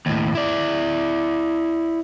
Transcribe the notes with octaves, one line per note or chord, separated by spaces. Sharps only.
D#2 A2
E4 D5